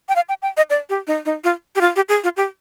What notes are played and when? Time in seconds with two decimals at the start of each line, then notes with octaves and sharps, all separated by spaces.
0.09 G5
0.16 F5
0.29 G5
0.42 G5
0.57 D#5
0.70 D5
0.89 G4
1.07 D#4
1.25 D#4
1.44 F4
1.76 G4
1.81 F4
1.96 G4
2.09 G#4
2.24 F4
2.37 G4